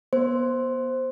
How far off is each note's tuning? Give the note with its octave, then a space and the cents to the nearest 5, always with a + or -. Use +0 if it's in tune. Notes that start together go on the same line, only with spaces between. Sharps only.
B3 -30 C5 +0